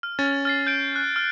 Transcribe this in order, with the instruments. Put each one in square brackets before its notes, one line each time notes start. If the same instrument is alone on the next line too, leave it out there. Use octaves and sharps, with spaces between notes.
[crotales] F6
[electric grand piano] C#4 [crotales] A6
[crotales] F6 A6 C7
G6 D7
F#6
F6